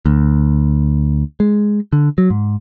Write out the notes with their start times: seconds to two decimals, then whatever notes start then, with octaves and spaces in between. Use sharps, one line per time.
0.06 D2
1.40 G#3
1.93 D3
2.18 F#3
2.30 G#2